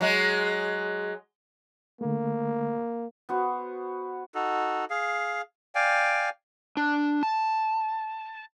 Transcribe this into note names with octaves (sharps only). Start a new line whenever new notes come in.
F#3 G#3
D3 A3 A#3
B3 F#4 C5
D#4 F#4 A4
G#4 F5
D5 F5 G5 G#5
D4
A5